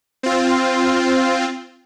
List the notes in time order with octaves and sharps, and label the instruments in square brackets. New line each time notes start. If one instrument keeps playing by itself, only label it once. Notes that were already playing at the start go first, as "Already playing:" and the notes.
[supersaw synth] C4 F4